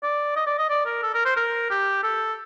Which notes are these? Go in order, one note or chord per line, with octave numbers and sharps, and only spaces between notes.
D5
D#5
D5
D#5
D5
A#4
A4
A#4
C5
A#4
G4
A4